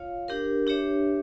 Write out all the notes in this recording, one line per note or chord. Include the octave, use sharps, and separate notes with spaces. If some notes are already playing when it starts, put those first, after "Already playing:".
Already playing: F4 C#5 F5
D4 G4 A#4
D4 G4 C#5 E5